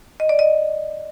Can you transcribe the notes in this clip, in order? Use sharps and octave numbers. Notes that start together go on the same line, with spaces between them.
D#5
D5
D#5